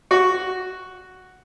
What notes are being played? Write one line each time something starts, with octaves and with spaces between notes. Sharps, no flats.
F#4